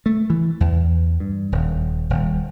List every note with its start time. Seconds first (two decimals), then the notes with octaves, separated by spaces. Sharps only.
0.06 A3
0.30 E3
0.60 E2
1.20 G2
1.52 D#1
2.10 D#1